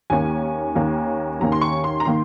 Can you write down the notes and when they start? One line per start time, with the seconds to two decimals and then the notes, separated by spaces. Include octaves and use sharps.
0.10 D#2 D#3 A#3 C#4 G#5
0.75 D#2 D#3 A#3 C#4
1.40 D#2 D#3 A#3 C#4 A#5
1.52 C6
1.61 C#6
1.84 C6
2.00 A#5
2.05 D#3 A#3 C6